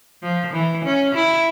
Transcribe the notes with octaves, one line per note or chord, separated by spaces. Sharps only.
F3
E3
C#4
E4